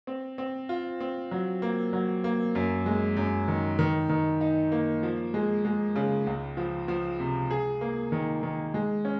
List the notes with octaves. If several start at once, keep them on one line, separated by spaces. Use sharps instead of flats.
C4
C4
F4
C4
F#3
A#3
F#3
A#3
F#2
G#3
F#2
D#3
D#3
D#3
D#4
A#3
F3
G#3
G#3
C#3
C#2
F3
F3
C3
G#4
A#3
D#3
D#3
G#3
C#4